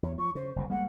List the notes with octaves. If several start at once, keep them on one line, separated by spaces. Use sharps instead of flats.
E2 C#5
F3 C#6
C#3 C5
F#1 C2 C3
G3 G#3 A#3 F#5